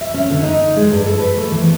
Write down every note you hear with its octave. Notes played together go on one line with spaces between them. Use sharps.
E5
C#4
D3
D#4
G#3
G2
A4
B4
A3
E3
B3